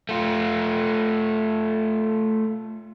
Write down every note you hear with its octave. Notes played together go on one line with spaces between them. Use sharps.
A3 F4